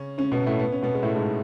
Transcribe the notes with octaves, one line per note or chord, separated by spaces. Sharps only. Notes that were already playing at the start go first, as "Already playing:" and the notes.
Already playing: C#3 C#4
C#3 C#4
B2 B3
A2 A3
B3
C#4
B2 B3
G#3
A2 A3
G#2 G#3